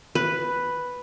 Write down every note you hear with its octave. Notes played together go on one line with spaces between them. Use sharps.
B4